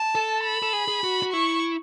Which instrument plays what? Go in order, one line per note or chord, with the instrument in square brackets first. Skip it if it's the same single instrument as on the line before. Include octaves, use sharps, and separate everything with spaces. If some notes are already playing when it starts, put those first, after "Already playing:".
Already playing: [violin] A5
[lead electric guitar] A4
[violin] B5
[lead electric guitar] A4
G#4
G#4
F#4
F#4
[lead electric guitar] E4 [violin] C#6